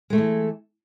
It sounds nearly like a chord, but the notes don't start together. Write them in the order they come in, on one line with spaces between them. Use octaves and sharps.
G#3 A3 A4 E3